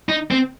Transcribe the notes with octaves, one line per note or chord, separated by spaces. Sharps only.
D#4
C4